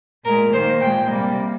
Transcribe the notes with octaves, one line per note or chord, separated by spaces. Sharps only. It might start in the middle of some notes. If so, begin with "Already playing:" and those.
A#2 G#3 A#4
D#3 A#3 C5
A#2 G#3 G5
C3 G3 A#3